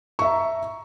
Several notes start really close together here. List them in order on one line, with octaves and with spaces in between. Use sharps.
C#6 E5 A#5